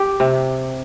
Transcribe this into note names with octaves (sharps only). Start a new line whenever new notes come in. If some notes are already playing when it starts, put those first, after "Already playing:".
Already playing: G4
C3